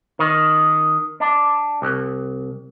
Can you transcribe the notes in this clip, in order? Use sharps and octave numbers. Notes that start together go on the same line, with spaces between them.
D#3
D4
C2